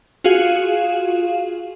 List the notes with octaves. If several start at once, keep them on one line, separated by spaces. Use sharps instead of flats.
F4 F#4 G#4 F5